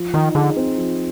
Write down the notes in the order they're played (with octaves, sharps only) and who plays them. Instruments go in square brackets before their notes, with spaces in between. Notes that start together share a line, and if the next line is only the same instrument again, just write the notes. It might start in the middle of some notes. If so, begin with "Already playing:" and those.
Already playing: [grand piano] F3
[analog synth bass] D#3 [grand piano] D#4
[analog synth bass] D3 [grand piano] G#4
[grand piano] C4
F3